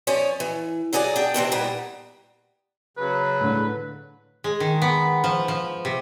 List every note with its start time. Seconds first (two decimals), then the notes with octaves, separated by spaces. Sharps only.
0.07 F3 C#4 C#5 D5
0.40 E3
0.93 C3 F#3 G#4 D5 G#5
1.16 D4 G5
1.34 C3 E3 C4 D4
1.52 A#2 G3 B3
2.97 C#3 F#3 B4
3.40 A2 D3
4.44 G#3
4.60 D#3
4.82 B3
5.24 F3
5.48 F3
5.85 C3